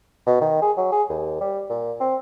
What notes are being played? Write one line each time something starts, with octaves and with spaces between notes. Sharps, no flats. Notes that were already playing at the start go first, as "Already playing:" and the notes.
B2
D#3
G#4
F#3
G#4
D#2
G3
A#2
C4